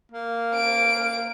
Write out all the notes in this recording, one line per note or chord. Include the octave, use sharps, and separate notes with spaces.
A#3
D7